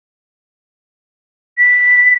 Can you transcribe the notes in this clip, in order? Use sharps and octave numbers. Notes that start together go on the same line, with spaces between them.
B6